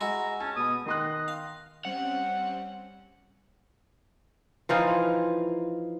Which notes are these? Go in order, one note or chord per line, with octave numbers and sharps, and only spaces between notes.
G#3 E4 F#4 A#5
C#4 F#5 A5
B2 B5 D#6
D#3 D#5 C6 F#6
F5
G3 C4 C#4 F#5
E3 F3 D#4 F4